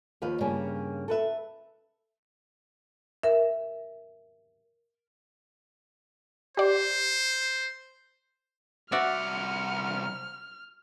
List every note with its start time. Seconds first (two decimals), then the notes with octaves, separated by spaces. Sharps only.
0.22 D#2 F3 B4 F5
0.41 G2 C#3 A#3 C#4
1.08 A4 B4 E5
3.23 A#4 E5
6.57 G4 C5 D5
8.92 C2 F#4 D5 E5 F#5 F6